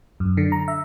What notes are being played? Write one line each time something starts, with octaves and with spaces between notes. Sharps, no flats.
F#2
D3
A#5
E5